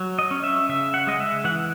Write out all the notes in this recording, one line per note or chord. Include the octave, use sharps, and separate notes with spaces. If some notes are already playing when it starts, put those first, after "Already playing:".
Already playing: F#3
D#5
C#4
E5
C#3 E5
F#5
G#3 D#5
E5
E3 F#5